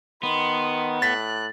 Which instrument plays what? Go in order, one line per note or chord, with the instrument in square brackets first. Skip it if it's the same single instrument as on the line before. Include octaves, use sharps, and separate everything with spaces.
[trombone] D#3 [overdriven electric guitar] B3 [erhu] C6
[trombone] A2 [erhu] F#6 [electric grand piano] A6 B6